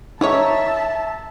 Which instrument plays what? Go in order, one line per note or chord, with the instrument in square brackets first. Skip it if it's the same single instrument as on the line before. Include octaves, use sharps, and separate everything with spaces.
[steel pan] D#4 [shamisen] E4 G#4 C#5 [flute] E5 [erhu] A5